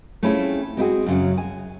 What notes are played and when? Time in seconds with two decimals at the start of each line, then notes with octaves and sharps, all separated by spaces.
0.23 A3 C4 C#4 E4 F4 G#4
0.77 G#3 C4 D4 E4 F#4 G#4
1.06 F#2 C#3 F#3
1.37 G#5